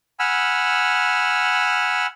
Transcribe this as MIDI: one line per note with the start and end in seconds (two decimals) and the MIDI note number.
0.19 2.06 78
0.19 2.06 80
0.19 2.06 83
0.19 2.06 88
0.19 2.06 89